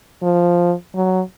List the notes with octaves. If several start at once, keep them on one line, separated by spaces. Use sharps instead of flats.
F3
F#3